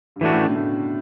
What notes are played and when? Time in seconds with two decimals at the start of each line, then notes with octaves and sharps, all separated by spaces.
0.16 G2
0.21 A2 E3 A3 D4 F#4
0.33 A2 C#3
0.45 B2 D3
0.56 A2 C#3